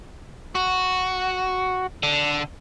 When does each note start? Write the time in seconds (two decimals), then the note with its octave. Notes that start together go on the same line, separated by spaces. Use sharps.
0.55 F#4
2.03 D3